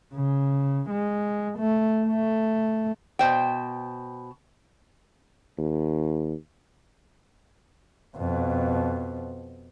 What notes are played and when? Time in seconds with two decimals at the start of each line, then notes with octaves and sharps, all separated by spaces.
0.14 C#3
0.90 G#3
1.59 A3
2.07 A3
3.19 B2 C5 G5
5.58 D#2
8.17 F2 B2